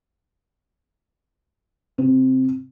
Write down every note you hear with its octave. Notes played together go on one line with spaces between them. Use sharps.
C3 C4